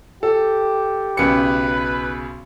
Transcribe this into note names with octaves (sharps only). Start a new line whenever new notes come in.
G4 A4
B1 C#3 B4 C#7